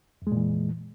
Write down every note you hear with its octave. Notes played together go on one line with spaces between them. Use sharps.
F2 A#2 E3 G#3